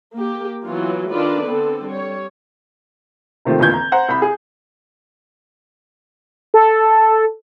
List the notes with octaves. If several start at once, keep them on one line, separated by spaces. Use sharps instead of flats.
A#3 G4
E3 F#3 B3 F4
D#3 D4 F4 A4 B4 D5
D3 B3 C4 A4
G3 C#5
C3 D#3 F3 A3 C4
F1 E2 A#2 D3 G6 G#6
A#5
C5 F#5 A#5
C2 B5
G#4
A4